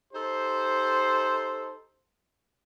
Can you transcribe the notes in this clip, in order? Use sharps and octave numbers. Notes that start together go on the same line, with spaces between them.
D#4 G4 A4 C5